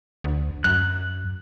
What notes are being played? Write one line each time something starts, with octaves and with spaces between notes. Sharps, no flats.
D2
F#2 F#6